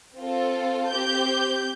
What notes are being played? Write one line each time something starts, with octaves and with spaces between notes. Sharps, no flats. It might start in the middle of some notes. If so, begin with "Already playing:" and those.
C4 F4 A4
C4 G4 G6